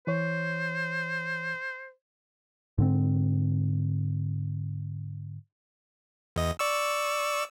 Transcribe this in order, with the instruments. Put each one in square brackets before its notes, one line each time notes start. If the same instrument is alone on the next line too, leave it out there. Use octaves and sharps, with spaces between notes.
[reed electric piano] E3 C#5 [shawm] C5
[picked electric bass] G#2 D3 C4
[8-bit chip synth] E2 D#5
D5 C#6 E6